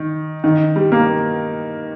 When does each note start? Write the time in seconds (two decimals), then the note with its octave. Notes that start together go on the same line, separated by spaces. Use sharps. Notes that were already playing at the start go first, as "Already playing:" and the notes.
Already playing: D#3
0.44 D#3
0.76 G3
0.92 A#3